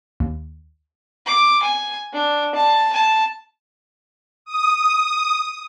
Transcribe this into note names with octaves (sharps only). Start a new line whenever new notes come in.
D#2
D6
G#5
D4
A5
A5
D#6